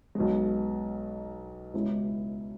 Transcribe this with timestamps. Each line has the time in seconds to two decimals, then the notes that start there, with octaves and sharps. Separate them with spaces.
0.15 B1 B2 G#3
1.74 C#2 B2 G#3 C#4 E4